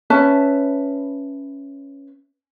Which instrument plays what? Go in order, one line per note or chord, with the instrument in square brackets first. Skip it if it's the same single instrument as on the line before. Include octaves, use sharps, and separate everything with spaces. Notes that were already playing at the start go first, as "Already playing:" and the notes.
[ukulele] C#4 B4 E5 A5